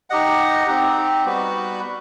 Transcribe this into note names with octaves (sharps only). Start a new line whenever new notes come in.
D#4 G4 D#5 F#5
C4 D#4 G4
G3 B3 F#4 B4